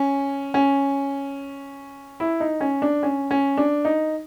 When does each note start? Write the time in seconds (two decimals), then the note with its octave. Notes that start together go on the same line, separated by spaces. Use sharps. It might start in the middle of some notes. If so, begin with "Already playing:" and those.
Already playing: C#4
0.54 C#4
2.20 E4
2.40 D#4
2.60 C#4
2.82 D4
3.03 C#4
3.31 C#4
3.57 D4
3.85 D#4